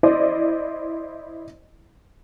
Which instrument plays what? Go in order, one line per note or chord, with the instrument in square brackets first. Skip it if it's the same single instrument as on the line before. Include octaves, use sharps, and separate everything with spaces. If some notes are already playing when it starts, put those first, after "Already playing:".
[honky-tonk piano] E4 C5 D5 D#5